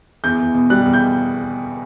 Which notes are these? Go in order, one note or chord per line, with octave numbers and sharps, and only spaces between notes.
E2 G6
E2
B2
G3 F#6
E2
G6